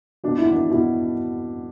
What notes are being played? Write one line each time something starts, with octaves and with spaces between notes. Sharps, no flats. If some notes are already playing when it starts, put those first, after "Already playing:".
B2 D4
E4
D4
B2 E4